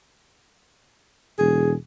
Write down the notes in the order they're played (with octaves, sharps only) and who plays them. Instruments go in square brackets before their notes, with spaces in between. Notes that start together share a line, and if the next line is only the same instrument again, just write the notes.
[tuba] E1 [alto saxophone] G#4